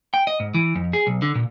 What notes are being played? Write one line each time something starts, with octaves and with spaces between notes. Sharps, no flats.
G5
D#5
G#2
E3
F2
G#4
B1
D3
A#2